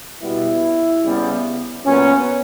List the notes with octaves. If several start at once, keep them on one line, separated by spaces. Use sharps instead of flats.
B2 G3 B3 E4
C#3 G3 B3
A#2 F#3 B3 C#4